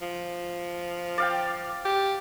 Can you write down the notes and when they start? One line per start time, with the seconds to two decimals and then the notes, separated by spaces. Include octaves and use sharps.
0.01 F3
1.18 D5 F5 G5
1.85 G4